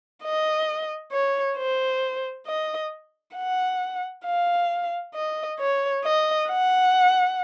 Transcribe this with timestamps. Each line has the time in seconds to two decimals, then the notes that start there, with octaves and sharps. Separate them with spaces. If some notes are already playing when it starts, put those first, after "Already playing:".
0.24 D#5
1.12 C#5
1.58 C5
2.47 D#5
3.36 F#5
4.25 F5
5.15 D#5
5.59 C#5
6.04 D#5
6.49 F#5